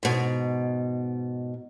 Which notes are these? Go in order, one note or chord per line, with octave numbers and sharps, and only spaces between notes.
G#2 B2